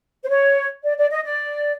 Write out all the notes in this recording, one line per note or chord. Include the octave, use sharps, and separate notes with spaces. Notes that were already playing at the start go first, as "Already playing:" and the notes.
C5
C#5
D5
D5
D#5
D5